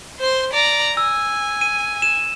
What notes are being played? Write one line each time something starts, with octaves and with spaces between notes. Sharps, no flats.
C5 C6
D5 A#5
G#5 E6
D#7
E7